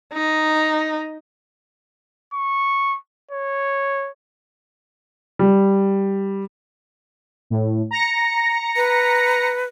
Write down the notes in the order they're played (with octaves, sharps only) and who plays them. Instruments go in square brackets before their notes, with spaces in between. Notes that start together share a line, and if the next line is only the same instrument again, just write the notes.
[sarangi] D#4
[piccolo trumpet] C#6
C#5
[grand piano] G3
[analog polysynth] A2
A#5 A#6 C#7
[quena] B4